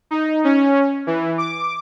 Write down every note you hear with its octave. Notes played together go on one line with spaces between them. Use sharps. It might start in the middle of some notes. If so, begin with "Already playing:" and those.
D#4
C#4
E3
D6